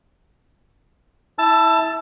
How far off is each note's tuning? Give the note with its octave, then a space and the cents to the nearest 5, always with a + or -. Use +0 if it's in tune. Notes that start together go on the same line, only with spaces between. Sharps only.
E4 -15 A5 +0 E6 +25